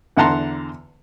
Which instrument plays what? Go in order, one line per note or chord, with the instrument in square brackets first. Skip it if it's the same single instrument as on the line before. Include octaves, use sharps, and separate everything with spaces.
[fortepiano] E2 D3 F#5 A5 A#5 C6